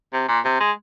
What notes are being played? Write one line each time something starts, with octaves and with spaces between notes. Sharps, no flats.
C3
A#2
C3
G#3